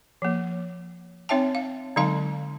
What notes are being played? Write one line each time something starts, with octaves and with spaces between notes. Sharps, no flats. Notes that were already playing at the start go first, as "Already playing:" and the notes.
F3 A#3
C4 D#4 C#5 E5 G5 A5
F5
D3 F#3 G#3 D#4 F5 A5